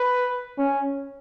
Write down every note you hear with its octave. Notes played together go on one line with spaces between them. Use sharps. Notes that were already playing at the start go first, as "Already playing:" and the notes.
Already playing: B4
C#4